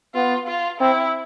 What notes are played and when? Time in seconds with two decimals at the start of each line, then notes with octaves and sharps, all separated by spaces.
0.15 B3 F4
0.48 F4
0.81 C4 E4